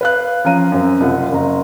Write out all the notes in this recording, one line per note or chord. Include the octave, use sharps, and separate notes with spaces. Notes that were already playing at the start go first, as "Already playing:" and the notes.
B4 F5 F#6
F3 C#4 F5 A#5 D#7
F#2 C4
F#1 C2 F4 F#5
F#1 A#5